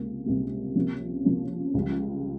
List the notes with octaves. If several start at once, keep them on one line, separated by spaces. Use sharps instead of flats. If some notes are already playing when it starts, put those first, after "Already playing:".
Already playing: C#2 C3 A#3
C#2 C3 G3 A#3
C3 F3 A#3 C#4
C3 F3 A#3 C#4
C#2 C#3 G3